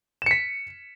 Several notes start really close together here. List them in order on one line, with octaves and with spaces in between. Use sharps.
E7 C#7 B6